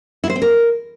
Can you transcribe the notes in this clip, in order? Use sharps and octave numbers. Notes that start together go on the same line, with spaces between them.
E4
C5
C4
A#4